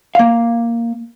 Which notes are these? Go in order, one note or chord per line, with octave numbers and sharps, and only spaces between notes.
A#3 F5